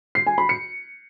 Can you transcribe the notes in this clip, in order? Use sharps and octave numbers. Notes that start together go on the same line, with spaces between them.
C7
G#5
B5
C#7